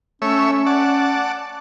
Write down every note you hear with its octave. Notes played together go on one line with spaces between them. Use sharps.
A3 C#4 C#5 E5
D5 F#5 A5